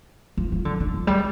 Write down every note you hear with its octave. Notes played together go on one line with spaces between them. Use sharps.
F3
F3
D3
D#3
F3
G3